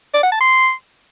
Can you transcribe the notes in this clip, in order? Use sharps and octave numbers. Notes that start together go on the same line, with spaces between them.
D5
F#5
A5
C6